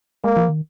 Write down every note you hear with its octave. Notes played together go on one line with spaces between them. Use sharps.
G#3 A#3
F3
D#3